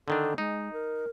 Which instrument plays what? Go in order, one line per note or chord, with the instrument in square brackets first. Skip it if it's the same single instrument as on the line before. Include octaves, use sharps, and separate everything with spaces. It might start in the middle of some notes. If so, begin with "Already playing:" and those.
[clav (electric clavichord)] D3 D#3 D4 [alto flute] A4
[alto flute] G#3 [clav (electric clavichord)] D#4
[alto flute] A#4